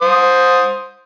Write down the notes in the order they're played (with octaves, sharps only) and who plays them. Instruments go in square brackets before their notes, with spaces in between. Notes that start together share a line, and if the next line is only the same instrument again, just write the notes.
[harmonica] C5 D#6